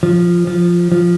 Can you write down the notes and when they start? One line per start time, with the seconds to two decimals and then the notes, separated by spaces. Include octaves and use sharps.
0.03 F3
0.47 F3
0.92 F3